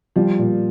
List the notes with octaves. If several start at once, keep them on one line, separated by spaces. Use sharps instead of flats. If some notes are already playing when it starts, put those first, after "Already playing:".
F3 G3
A#2